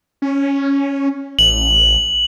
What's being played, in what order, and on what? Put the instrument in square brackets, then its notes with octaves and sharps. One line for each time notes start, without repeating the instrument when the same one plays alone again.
[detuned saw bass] C#4
[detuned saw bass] A1 [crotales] F#7